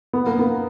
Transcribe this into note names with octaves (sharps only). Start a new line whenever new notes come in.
B3
A#3
B3